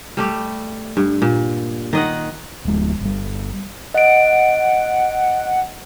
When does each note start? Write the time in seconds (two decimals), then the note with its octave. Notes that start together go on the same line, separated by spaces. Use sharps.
0.17 G3 A3 G4
0.97 G2
1.22 A#2
1.93 D#3 D#5 F#5
2.65 D1 G#3
3.01 G1 G3
3.94 D#5 F#5 D7